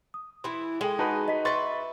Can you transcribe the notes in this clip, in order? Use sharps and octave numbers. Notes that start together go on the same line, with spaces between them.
D#6
E3 E4 C6
G#3 G#4 A4 D#5 G5
D#4 F#4 B4 A5
D#5 B6
B4 E5 C6 C#6 A6